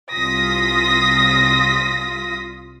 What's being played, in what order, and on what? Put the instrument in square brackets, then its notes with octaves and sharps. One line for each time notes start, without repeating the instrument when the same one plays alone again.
[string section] C2 F4 D#6 A#6 B6